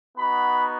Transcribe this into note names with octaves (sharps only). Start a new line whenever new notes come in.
B3 D#4 F#4 B5